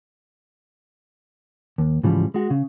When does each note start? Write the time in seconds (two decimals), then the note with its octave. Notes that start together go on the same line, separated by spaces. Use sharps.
1.78 D#2
2.04 G#2 C#3 E3 F3 G3
2.34 G#3 F#4
2.50 C#3